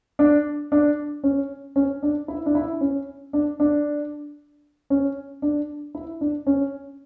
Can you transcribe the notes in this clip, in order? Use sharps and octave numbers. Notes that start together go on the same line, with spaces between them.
D4
D4
C#4
C#4
D4
E4
D4
E4
C#4
D4
D4
C#4
D4
E4
D4
C#4